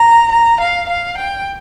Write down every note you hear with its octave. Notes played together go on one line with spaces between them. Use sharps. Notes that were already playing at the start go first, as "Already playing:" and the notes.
Already playing: A#5
A#5
F5
F5
G5